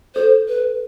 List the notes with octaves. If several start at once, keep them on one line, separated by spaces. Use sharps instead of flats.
A4 C5
B4